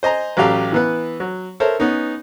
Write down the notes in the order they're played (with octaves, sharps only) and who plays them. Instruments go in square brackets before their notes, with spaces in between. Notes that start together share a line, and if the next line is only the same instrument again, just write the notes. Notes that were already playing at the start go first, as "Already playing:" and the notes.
[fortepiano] C5 D#5 G#5 A#5
A1 F#3 G4 F5 A5
E3 B3 B4
F#3
A4 A#4 C5 C#5 E5
B3 C#4 D#4